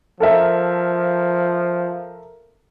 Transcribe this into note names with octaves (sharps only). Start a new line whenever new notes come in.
F3 A4 A#4 E5